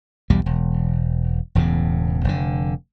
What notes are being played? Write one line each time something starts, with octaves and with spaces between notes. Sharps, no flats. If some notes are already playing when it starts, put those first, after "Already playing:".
B1 E2 G3
E1
E1 E2 A2 C#3
F1 D3